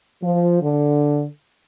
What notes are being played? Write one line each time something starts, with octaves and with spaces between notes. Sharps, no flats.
F3
D3